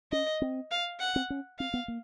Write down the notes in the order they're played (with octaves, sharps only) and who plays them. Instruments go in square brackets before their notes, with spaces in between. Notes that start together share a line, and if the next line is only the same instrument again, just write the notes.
[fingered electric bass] C#4 [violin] D#5
[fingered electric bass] C4
[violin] F5
F#5
[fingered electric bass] C4
C#4
[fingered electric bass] C4 [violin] F5
[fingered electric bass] B3
A#3